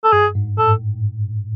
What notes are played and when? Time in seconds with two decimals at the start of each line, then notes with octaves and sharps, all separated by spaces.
0.04 A4
0.13 G2 G#4
0.35 G#2
0.58 A2 A4